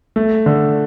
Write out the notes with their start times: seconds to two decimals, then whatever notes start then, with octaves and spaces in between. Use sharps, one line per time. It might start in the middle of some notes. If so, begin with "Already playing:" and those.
0.16 A3
0.46 D3